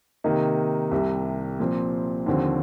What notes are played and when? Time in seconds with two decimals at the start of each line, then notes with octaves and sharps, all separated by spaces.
0.24 C3 D#3 A#3 D#4
0.91 C2 C3 G3
1.60 A#2 F3 C4
2.26 D#2 D3 F3 C4